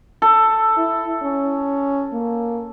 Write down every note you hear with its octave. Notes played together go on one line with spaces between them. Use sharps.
A4
E4
C#4
A#3